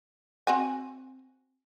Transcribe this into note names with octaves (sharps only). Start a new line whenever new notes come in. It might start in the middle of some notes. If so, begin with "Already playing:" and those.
C4 F#4 G#5